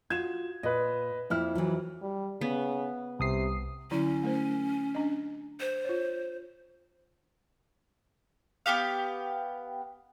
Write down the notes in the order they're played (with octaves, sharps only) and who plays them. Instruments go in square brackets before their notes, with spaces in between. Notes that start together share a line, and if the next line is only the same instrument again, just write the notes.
[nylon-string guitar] F4 F#4 [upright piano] G#6 E7
[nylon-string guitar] A#2 [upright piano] B4 D#5
[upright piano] F2 F6 [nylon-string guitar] A#3 E4
[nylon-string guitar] E3 F#3
[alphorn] G3
[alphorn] C#3 [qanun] B3
[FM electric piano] C2 D#6 C7 [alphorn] C3
[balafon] D3 F#3 E4 [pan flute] C#4
[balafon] A3 A#4 C5
D4 D#5
[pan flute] C5
[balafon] F4 C#5
[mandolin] B3 F#4 G4 F5